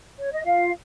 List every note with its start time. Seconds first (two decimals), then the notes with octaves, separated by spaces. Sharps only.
0.20 C#5
0.32 D#5
0.45 F4 F5